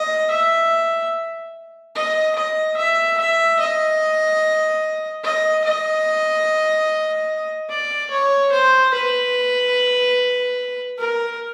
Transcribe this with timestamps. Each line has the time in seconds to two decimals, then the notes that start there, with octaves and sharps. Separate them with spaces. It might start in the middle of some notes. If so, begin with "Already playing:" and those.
Already playing: D#5
0.31 E5
1.95 D#5
2.36 D#5
2.77 E5
3.18 E5
3.60 D#5
5.24 D#5
5.64 D#5
7.69 D5
8.10 C#5
8.52 C5
8.94 B4
10.98 A#4